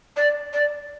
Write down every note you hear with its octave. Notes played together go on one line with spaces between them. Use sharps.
D5
D5